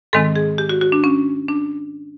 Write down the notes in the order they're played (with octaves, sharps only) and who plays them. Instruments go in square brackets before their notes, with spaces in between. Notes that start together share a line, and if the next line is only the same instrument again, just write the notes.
[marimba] G#2 D#3 G#3 C4 A4
G#4
G4
F#4
F#4
D4
C#4
D4